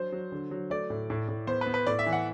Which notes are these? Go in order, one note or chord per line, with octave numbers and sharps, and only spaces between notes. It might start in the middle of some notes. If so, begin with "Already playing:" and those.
Already playing: F#3 D4 C5
F#3
D3
F#3
A3 D5
A2
A2
A2
B3 C5
B4
B3
B4
A2 D5
E5
E3
F#5